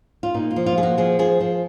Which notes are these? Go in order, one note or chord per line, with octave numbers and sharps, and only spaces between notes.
F4
A#2 D#4
F4
F3
F4
A#2 G#4
F#4
F3 G#4
F3 G#4
F3